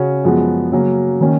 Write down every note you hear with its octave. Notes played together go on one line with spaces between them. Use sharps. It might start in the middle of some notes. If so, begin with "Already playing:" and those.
Already playing: C#3 C#4 F#4
F#2 F3 G#3 B3 F#4
C#3 F#3 A#3 C#4
D#3 A#3 C#4